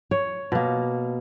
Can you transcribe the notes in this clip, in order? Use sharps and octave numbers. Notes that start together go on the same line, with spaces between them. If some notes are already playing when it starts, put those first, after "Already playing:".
C#5
B2 A#3